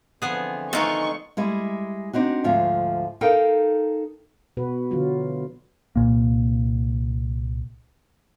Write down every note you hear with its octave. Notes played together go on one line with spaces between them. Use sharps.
D3 E3 F3 B3 C4 G#4
D#3 G#3 A3 D#4 F4 C#6
G3 G#3 E4
C4 D4 D#4 F#4
D2 G#2 F3 F4 E5
D#4 A4 A#4 F5 G5
B2 F#4 B4
D3 E3 F#3 F4
C2 A#2 A#3